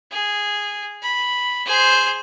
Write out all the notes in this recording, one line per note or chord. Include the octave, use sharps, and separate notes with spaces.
G#4
B5
G#4 C5